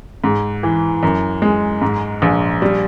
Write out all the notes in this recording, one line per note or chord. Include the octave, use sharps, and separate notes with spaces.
G#2
E3
F#2
G#3
G#2
A#1
G3